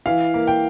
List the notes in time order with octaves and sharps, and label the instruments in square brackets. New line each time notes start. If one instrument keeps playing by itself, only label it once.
[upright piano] E3 F5
A#3
G5